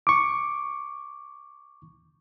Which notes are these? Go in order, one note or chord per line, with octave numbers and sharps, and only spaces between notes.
C#6 D6